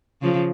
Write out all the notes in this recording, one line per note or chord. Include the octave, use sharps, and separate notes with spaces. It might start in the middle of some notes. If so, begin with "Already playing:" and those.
C#3 F3